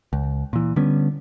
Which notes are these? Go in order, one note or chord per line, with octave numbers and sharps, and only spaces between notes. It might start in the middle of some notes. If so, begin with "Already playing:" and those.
C#2
A#2 E3
D3 G3 B3 C#4